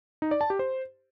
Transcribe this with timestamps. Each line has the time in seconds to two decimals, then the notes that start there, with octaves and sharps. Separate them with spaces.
0.22 D#4
0.31 D5
0.41 A5
0.50 G4
0.59 C5